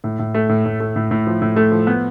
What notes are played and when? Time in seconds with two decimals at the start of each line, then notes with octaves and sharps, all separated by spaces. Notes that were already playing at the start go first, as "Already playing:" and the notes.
0.04 A2
0.19 A2
0.35 A3
0.49 A2
0.66 A2
0.80 A3
0.96 A2
1.11 A2
1.27 F3
1.42 A2
1.56 A3
1.72 F3
1.87 B3